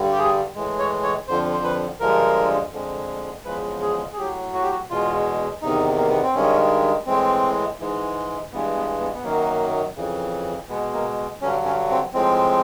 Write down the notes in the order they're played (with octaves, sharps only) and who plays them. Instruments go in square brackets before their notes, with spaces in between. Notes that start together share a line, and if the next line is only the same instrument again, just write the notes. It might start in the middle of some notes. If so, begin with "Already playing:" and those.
Already playing: [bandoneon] G2 D3 G3
G4
G#4
A2 E3 G#3
C#5
C#5
F2 D3 F3 C5
C5
B4
G2 D3 F3 G#3 A#4
F2 D3 F3 G#3
E2 C#3 F3 G#3 B4
G#4
G#4
A2 F#3 G4
F#4
G4
F#4
E2 B2 G#3 F4
E2 C3 D#3 D#4
A#3
B3
C4
G2 D#3 G#3 C#4
A2 E3 G#3 C4
G#2 E3 G#3
G2 E3 G#3 B3
B3
B3
B3
F#2 D#3 F#3 A#3
F2 C#3 E3
B2 G#3 B3
A#3
G2 D3 F#3 C#4
C#4
C4
A2 F3 G#3 C4